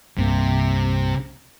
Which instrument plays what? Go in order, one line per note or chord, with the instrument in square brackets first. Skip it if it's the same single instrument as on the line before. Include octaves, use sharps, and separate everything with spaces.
[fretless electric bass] C2 G2 A#3 [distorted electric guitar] C3